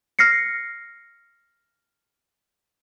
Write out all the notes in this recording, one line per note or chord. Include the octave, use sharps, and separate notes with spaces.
F6 A#6 C7 C#7